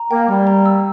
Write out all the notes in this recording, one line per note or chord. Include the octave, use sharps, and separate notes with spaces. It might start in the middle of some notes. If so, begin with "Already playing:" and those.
Already playing: A#5
A#3 G5
G3 G5
A#5
E6